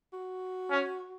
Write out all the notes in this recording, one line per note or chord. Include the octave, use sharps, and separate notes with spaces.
F#4
C#4